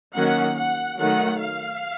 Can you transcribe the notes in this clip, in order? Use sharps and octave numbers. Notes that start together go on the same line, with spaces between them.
D#3 F#3 A#3 C#4 F#5
F#5
D#3 F#3 A3 F#5
F5